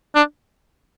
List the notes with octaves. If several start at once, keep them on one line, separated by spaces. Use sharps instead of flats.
D4